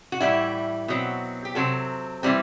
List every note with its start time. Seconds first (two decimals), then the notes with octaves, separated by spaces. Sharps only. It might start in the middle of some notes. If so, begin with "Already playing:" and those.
0.12 F#4
0.20 A2 E3 G3 E4
0.88 B2 F#3 C4
1.45 G4
1.55 C3 F#3 C4 A4
2.23 E3 G3 C4